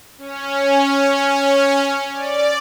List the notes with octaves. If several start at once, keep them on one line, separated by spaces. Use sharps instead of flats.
C#4
D5